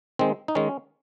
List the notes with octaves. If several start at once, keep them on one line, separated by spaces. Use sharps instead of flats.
D#3 G#3 C4
D#4
D#3 G#3 C#4